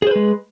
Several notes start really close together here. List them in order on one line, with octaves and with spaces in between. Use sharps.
G#4 C5 B4 G#3